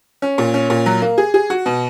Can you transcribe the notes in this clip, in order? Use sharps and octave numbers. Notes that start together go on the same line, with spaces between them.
C#4
A#2
C#4
A#2
F#3
A#3
G#4
G#4
F#4
B2